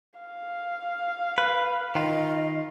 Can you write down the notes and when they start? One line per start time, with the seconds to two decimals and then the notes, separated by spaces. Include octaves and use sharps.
0.20 F5
1.38 B4
1.95 D#3 F4 D#5